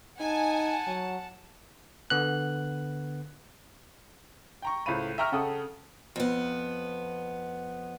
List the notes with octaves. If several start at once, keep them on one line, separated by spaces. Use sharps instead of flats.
D#4 F#5 G#5 A5
F#3
D3 B3 F#6
G5 A#5 C#6
C#2 A2 C5 F5 B5 D#7
E5 G5 A#5 C#6 F6
C#3 A4 F#5 G5 D#6
F2 B3